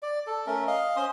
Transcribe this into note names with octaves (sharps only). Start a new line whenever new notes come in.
D5
A4
A3 C#4 A#4
D#5 F5
C#4 C5 C6 D#6